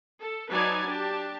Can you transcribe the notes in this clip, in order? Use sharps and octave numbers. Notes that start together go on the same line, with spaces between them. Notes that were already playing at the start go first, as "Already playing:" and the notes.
A4
F#3 D#4 B4 D5 G#5 A5
D4 G4 A5